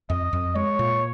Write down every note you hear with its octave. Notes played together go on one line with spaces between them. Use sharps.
F2 D#5
F2
G#3 C#5
A#2